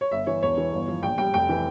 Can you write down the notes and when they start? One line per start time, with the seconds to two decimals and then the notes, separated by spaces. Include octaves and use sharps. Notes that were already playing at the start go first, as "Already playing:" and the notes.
0.01 C#5
0.11 G1 E5
0.27 E3 C#5
0.43 E1 C#5
0.57 E3
0.73 G1
0.88 F3
1.03 A#1 G5
1.18 G3 G5
1.34 F1 G5
1.49 E3